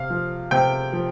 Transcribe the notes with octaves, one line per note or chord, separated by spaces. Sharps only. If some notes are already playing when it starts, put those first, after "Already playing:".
Already playing: C3 F5
F3
C3 G5
F3